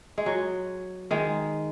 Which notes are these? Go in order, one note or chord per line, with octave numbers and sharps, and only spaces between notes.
G#3
F#3
D#3 G#3